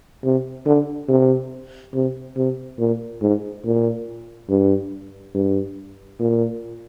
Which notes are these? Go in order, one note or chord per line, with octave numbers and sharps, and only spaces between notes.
C3
D3
C3
C3
C3
A#2
G#2
A#2
G2
G2
A#2